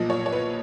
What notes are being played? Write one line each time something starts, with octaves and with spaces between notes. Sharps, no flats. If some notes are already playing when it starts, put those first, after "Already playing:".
Already playing: B1 A#2 F3 D#5
C#5
C#5
B4